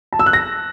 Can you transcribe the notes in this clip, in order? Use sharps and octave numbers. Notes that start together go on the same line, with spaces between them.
A5
E6
F#6
A#6